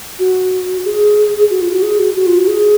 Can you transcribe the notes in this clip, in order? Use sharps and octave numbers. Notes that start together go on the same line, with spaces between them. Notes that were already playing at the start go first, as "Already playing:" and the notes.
F#4
G#4
F#4
F4
F#4
G#4
F#4
F#4
F4
F#4
G#4